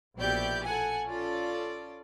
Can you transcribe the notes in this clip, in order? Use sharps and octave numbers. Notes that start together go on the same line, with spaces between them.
A#1 B2 E4 G4 D5 G6
A4 F#5 G#5
C#4 F4 A4 D5